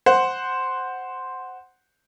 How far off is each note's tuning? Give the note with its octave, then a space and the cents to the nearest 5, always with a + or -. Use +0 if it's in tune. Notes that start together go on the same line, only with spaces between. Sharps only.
C5 +0 F#5 +0